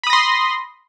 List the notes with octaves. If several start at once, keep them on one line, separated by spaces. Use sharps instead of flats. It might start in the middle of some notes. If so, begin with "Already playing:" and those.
B5 C6 D#6 A#6